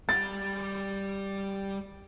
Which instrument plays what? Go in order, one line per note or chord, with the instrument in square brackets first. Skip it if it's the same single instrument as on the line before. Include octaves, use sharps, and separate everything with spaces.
[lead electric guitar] G3 B5 [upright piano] A6